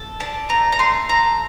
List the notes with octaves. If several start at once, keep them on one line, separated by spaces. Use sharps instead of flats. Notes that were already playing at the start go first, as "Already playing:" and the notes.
Already playing: A4
D4 A5
A3 A#5
A#5
A3 C6
A4 A#5